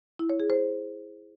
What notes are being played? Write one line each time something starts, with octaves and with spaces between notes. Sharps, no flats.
E4
C#5
G#4
C5